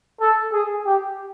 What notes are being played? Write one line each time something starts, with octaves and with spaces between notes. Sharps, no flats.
A4
G#4
G4